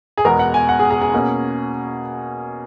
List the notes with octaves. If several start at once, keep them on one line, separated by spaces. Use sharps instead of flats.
G#4
E2 B2 G#3 B3 A#4
F#5
G#5
F#5
G#4
G#4
G#4
B2 A#3 C#4